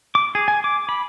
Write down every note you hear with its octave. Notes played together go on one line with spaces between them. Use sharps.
D6
G#4
G#5
D6
B5